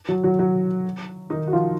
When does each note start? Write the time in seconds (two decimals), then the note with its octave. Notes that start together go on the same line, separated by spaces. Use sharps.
0.09 F#3 F#4
0.24 F#3 F#4
0.39 F#3 F#4
1.30 D#3 D#4
1.47 F#4
1.53 F3 F4